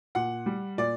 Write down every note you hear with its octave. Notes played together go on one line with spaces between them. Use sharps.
A#2 F#5
G3
A#2 D5